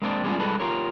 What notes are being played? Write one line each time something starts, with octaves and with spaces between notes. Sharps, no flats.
G#3 A#3 C4 D4 C#5 D5
G3 G#3 B3 C#4 D4 F4
G3 G#3 D#4 A4 B4
F4 G4 A#4 C#5